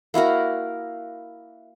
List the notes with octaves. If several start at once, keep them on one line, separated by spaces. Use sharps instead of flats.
A#3 E4 F#4 A#4